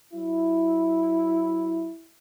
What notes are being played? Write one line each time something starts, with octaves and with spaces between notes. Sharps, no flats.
F#3 E4